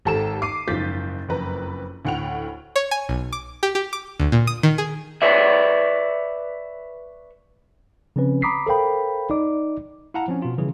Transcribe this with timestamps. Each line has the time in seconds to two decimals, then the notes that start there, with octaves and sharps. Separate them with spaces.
0.05 G#1 G4 A4 A#5 E7
0.42 D6 C7 D#7
0.67 F#1 G#2 F3 G6 A6 B6
1.28 F#1 F2 B4 A#5
2.05 D2 A2 F#5 G5 F7
2.76 C#5
2.91 G#5
3.09 B1
3.33 D6
3.63 G4
3.75 G4
3.93 D6
4.20 D2
4.32 A#2
4.47 D#6
4.63 D#3
4.78 G#4
5.22 B4 C#5 D5 E5
8.16 C#3 F3 C4 C#4 B4
8.42 A#5 B5 D6 D#6 B6 C7
8.66 A4 A#4 C5 F5 G5 B5
9.30 D#4 D5 D6
10.14 E4 F5 F#5 A5 A#5
10.28 F3 C4 C#4
10.42 B2 F4
10.58 C#3 E3 F3 G3 C#4 G#4